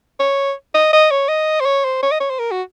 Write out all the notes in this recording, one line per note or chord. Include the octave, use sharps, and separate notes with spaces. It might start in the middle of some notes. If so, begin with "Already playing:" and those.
C#5
D#5
D#5
C#5
D#5
C5
C#5
C5
C#5
D#5
C#5
C5
A#4
F#4